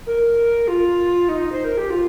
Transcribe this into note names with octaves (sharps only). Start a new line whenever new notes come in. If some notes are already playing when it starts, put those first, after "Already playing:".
A#4
F4
D#4
C5
A#4
G4
F4